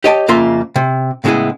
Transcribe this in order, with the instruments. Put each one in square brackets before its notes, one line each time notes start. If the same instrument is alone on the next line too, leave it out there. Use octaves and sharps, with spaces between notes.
[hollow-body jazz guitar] G4 C#5 D#5 G5 A5
F2 C#3 A#3 F4 E5 C6
C3
A2 C#3 G#3 B3 E4 G#4